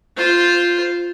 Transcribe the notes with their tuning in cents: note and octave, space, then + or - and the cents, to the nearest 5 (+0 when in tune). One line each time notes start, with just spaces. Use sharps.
F4 +0 C5 +0